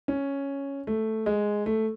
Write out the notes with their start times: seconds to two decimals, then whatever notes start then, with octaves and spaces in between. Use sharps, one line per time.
0.08 C#4
0.87 A3
1.26 G#3
1.66 A3